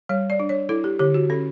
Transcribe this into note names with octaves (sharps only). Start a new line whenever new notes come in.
G3 C#5
D5
D4
C#5
E4 A4
G4
D3 G4
F#4
C#4 A4